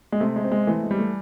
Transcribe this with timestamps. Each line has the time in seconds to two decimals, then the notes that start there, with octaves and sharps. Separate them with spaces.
0.12 G#3
0.20 C3 A3
0.36 G#3
0.44 C4
0.52 G#3
0.67 E3 A3
0.83 G#3
0.91 G3
0.99 A3